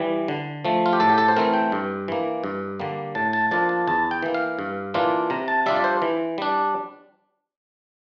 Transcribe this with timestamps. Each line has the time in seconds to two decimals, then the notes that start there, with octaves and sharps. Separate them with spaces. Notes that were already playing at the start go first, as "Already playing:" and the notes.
Already playing: E3 G3
0.28 D3
0.65 F3 A3
0.86 F4
0.93 G4
1.00 A2 A4
1.09 G4
1.18 A4
1.28 C5
1.37 E3 A3 C4 A#4
1.54 G5
1.72 G2
2.08 E3 A#3
2.44 G2
2.80 D3 G3 A#3
3.15 A2 A5
3.33 A5
3.51 F3 A#3 D4 F4 A5
3.69 A5
3.87 E2 A5
4.11 G5
4.23 E3 A#3
4.34 F5
4.59 G2
4.94 E3 A#3 D4 F4
5.30 C3 A#5
5.48 A5
5.66 G3 D4 F4 E5
5.76 D5
5.84 C5
6.02 E3
6.38 G3 D4